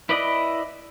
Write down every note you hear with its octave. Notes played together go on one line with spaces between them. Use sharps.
E4 B4 D5 D#5